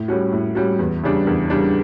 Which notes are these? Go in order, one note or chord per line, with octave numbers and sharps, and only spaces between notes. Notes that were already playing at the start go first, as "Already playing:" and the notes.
Already playing: A2
G3 C#4 F#4
A2
G3 C#4 F#4
E2
C#3 G3 D4
E2
C#3 G3 D4